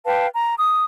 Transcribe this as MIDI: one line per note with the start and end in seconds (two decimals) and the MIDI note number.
0.06 0.27 71
0.06 0.27 77
0.06 0.27 79
0.06 0.27 81
0.33 0.54 82
0.57 0.84 87